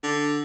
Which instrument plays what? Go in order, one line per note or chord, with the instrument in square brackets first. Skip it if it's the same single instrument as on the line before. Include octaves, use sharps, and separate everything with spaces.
[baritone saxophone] D3